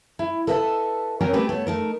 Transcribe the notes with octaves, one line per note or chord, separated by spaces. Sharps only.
E4
A4 B4 D#5 E5 F#5 A5
F#3 C4 C#4 A#4 C#5 G#5
A3 C4 G4 G#4 B4
A3 B3 C#5
A3 D#4 A#4